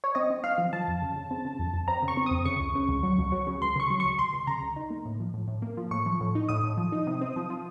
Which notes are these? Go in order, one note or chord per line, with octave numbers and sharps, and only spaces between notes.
C#5
C4 D#5
C4
C4 F5
F3
F3 A5
F2
C#3
C#3
C4
C#3
F2
F2
C4 A#5
C#3
C#6
C4
F2 D#6
C#3 C#6
C#2
C#3
C#2
F#3
C#2
F#3
C#3
C#2 C6
C#3 C#6
F#3
C#2 C#6
C#2 C6
C#2
C#3 A#5
C#2
D#4
A#3
A2
F3
A2
A2
A#3
F3
A2 C#6
F3
A2
D#4
A2 D#6
A2
F3
D#4
C3
C4
F3
F3